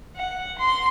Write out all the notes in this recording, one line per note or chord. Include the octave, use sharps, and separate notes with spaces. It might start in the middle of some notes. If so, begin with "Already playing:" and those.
F#5
C6